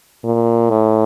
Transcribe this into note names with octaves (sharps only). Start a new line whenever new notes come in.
A#2
A2